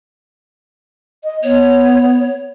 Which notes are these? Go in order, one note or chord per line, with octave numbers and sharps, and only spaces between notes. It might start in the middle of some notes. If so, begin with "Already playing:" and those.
D#5
B3 C#5